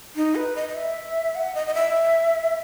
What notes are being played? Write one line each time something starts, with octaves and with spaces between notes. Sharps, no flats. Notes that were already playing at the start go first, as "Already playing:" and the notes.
D#4
B4
D#5
D#5
E5
F#5
D#5
D#5
E5